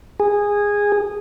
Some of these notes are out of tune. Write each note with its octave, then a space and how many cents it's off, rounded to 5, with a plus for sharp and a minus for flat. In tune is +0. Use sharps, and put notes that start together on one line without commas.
G#4 -15